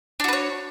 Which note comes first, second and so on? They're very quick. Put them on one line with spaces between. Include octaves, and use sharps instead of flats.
D4 F#4 B4 C#5